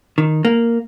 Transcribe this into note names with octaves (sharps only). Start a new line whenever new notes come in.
D#3
A#3